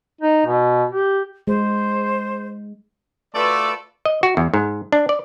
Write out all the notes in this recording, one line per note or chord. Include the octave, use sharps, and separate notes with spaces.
D#4
B2
G4
G#3 C5
A3 F4 F#4 A4 B4 D5 E6
D#5
F#4
E2
G#2
D4
D5